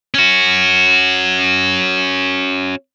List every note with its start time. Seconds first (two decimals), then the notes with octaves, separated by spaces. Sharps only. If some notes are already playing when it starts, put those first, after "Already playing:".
0.14 C#4 F#4